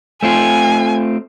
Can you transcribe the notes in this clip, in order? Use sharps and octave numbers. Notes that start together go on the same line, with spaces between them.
A3 C4 F4 G#5